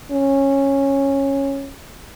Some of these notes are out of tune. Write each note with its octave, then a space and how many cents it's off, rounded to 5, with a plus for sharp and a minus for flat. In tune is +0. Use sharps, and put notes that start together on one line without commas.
C#4 -10